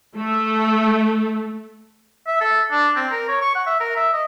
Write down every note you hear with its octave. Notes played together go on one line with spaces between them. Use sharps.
A3
E5
A4
D4
C4
A#4
C#5
C#6
F#5
E5
A#4
E5
D#5